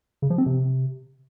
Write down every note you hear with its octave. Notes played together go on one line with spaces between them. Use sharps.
C#3
F3
C4
C3